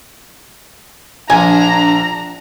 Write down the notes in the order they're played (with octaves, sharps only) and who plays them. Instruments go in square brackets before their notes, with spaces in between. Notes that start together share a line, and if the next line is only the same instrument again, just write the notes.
[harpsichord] A#1 [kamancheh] D4 A#5 [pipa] G#5